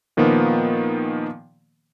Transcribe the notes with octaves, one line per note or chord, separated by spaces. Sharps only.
A#2 D#3 F3 A#3 B3